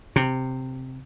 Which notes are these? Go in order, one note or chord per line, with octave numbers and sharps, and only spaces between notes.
C3